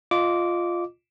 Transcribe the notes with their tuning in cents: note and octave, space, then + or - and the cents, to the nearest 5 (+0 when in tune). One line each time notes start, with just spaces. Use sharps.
F4 +0 D#5 -20 D6 -15